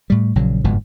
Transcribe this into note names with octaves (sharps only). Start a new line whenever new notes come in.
A2 G3
A#1 C#3 F#3
G1 F2 G#2 B2